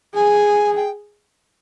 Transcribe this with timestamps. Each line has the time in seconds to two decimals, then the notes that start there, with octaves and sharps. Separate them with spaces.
0.14 G#4 G#5
0.76 G5